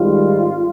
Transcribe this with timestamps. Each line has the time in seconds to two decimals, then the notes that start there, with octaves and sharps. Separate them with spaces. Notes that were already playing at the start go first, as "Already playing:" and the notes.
Already playing: G#1 G#2 G3 F4